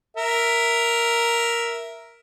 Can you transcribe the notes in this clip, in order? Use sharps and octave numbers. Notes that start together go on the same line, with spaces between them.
A#4 E5